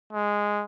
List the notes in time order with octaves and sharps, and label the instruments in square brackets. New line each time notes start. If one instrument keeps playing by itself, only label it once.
[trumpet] G#3